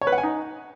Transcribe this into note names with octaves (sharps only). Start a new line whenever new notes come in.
C#5
B4
F#5
G#5
D#4